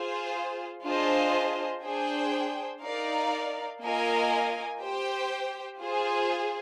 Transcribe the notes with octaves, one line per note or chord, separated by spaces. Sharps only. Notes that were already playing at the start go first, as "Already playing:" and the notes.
Already playing: F4 G#4 C5
D4 F4 G#4 C5 D#5
D4 G#4 C5 G5
D#4 A#4 D5 F5
A#3 F4 A#4 D#5 G#5
G4 C5 G5
F4 G#4 C5